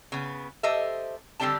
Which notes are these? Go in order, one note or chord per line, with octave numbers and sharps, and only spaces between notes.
C#3 B3
G4 A4 C5 D#5 E5
D3 G3 C4 D4 G4 A5